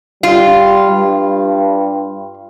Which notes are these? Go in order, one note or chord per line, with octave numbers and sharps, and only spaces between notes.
G3 F4
G2